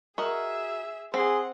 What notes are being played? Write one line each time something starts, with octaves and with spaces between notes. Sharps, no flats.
F#4 G#4 A#4 D#5 E5
C4 G#4 F#5 C6